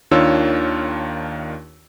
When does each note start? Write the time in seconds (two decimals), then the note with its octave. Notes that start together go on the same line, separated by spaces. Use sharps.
0.11 D#2 D#3 D4 F4 C#5 E6